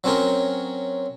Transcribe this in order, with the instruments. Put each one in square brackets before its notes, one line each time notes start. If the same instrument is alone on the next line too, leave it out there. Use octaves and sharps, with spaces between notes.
[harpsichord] F#3 C4 C#4 A#4